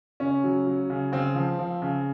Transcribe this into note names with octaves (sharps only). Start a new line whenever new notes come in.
C#3 C#4
F#3
F#3
C#3
C#3 C4
F3
F3
C#3